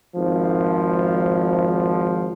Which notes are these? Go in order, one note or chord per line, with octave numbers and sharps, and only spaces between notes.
G#1 F3